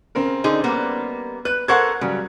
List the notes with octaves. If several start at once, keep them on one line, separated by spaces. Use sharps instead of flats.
C#3 C4 A#4
D3 D#4 G#4
G3 A#3 B3
B4 F#6
A4 A#4 C5 F#5 C#6 G#6
C#3 F#3 G3